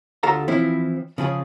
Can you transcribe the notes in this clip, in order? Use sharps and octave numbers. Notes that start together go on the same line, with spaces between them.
D2 F4 G4 A4 F5 A#5
E3 F3 C4 E4
C#3 F3 G#4